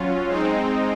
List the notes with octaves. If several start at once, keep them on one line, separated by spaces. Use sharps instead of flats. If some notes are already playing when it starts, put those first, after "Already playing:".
Already playing: F#3 C#4 F4
G#3 C4 D#4